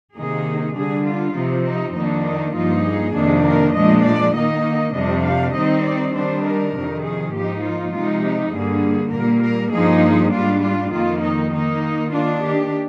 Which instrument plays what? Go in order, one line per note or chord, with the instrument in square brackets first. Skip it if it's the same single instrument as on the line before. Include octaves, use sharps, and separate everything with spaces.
[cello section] C3 D#3 A#3 D#4 G#4
D3 G3 D4 G#4
F4
C3 F3 C4 D#4
D#4
F2 D#3 A#3 D4 D#4
D#4
G2 F3 A#3 D#4 F4
G#4
F2 C3 D#3 A#3 D4
A#4
A#2 F3 G#3 D4 D#5
D5
D#3 A#3 D#4 D#5
F2 C3 G3 D4 D#5
F5
D#3 G3 C4 D#4 D#5
D5
D#3 G3 D4 C5
A#4
F2 C3 D#3
G#4
G#2 F3 A#3 D#4 G4
F4
C3 F3 G#3 D#4 F4
G4
G2 D3 G3 A#3 G#4
A#2 G3 A#3 A#4
A#4
G2 F3 A#3 D#4 G#4
G#2 G3 D4 F4
F4
F2 D#3 A#3 F4
D#4
D#3 A#3 D#4
D#3 A#3 D4 F4
G4